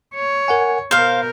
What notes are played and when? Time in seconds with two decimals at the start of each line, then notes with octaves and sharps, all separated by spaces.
0.15 C#5
0.48 A#4 F#5 G#5
0.91 B2 A#4 C5 F5 G6